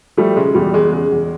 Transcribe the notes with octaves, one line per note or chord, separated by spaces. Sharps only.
F3 G3 A3
C#3 G#3
E2 G3
E2 G#3
C#3 G#3
E2